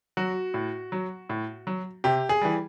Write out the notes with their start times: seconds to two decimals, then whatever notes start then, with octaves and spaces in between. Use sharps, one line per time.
0.17 F#3 F#4
0.54 A2
0.92 F#3
1.29 A2
1.67 F#3
2.04 C3 G4
2.29 G#4
2.41 E3 G3